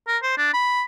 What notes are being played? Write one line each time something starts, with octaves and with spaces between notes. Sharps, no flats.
A#4
C5
D4
B5